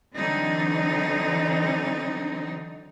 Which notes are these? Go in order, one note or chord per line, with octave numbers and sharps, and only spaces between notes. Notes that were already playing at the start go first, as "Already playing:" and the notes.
D3 E3 F#3 C4 D4 D#4